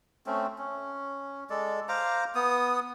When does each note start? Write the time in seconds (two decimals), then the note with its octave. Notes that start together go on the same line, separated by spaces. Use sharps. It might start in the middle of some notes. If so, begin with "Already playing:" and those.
0.27 A3 C4 C#4
0.58 C#4
1.50 G#3 A4 D5
1.89 C5 F5 A#5 D6
2.35 B3 D#6